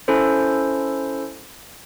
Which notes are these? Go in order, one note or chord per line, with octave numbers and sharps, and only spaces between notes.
C#4 E4 A4 C5